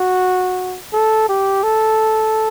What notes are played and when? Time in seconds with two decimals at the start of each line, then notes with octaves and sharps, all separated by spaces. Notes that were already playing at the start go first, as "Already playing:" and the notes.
Already playing: F#4
0.93 A4
1.29 G4
1.63 A4